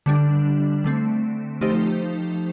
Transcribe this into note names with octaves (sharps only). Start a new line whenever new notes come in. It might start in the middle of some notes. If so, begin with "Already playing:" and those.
D3 G3 D4
D3 A3 C4
F3 A3 D#4 G4 C5